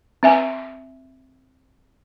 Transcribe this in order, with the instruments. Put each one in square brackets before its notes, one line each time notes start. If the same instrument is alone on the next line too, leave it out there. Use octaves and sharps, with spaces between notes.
[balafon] C4 E5 G#5